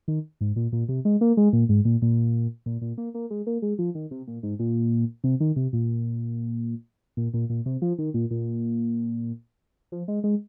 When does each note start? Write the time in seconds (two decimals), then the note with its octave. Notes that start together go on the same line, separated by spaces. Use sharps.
0.08 D#3
0.41 G#2
0.56 A#2
0.72 A#2
0.89 C3
1.05 G#3
1.21 A#3
1.37 G#3
1.53 A#2
1.69 G#2
1.85 A#2
2.02 A#2
2.66 A#2
2.82 A#2
2.98 A#3
3.14 A#3
3.31 G#3
3.47 A#3
3.62 G#3
3.79 F3
3.95 D#3
4.11 C3
4.27 A#2
4.43 G#2
4.59 A#2
5.24 C3
5.40 D#3
5.56 C3
5.73 A#2
7.17 A#2
7.34 A#2
7.50 A#2
7.66 C3
7.82 F3
7.98 D#3
8.14 A#2
8.31 A#2
9.92 F3
10.08 G#3
10.24 G#3